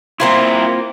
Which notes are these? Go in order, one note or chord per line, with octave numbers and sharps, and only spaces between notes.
A#3 C4 E4 F4 A#4